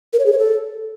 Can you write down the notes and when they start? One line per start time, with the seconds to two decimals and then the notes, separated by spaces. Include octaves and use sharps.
0.13 A#4
0.19 C#5
0.26 G#4
0.32 C#5
0.38 A4